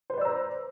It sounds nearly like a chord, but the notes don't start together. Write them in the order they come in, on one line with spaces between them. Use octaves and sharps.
C5 B4 D5 E6 A#5